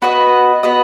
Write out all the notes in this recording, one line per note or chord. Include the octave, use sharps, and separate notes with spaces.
B3 F#4 B4 D#5
B3 F#4 B4 D#5